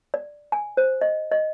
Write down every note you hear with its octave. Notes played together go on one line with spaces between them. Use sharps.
D5
G#5
C5
D#5
D#5